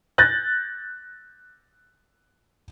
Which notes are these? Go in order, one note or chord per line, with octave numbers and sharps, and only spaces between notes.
F#6 G6 A6 A#6